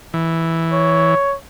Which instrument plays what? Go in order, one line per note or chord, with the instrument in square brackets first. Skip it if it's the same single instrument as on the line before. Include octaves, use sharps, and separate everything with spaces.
[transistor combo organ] E3
[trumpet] C#5